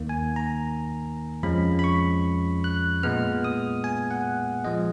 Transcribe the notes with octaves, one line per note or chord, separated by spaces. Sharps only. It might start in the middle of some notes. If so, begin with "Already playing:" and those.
Already playing: D#2 D#3 A#3
G#5
A#5
F2 F3 G#3 C#4 B5
B5
C#6
F#6
A#2 G#3 B3 F6
D#6
G#5
F#5
F3 G#3 D#5